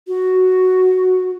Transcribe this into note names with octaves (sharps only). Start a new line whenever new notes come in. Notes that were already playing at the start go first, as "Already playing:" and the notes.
F#4